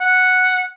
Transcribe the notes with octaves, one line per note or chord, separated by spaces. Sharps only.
F#5